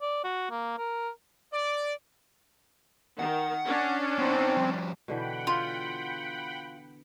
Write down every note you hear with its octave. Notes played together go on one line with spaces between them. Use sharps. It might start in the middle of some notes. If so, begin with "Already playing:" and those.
D5
F#4
A#3
A#4
D5
D#3 F#5
C#4 D4
B3 C4 D#4
F3 G3
B2 D3 E3 F#5 G5 B5
F4